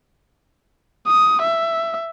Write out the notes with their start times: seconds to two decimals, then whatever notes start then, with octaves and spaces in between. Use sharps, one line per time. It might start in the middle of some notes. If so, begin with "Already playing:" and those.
1.07 D#6
1.42 E5